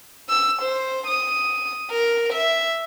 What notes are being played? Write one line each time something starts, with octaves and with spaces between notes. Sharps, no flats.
E6
C5
D#6
A#4
E5